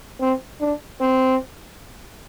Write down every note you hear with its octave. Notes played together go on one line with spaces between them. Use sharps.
C4
D4
C4